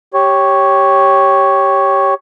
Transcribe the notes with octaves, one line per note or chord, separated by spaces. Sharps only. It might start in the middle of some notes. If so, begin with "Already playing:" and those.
G4 C#5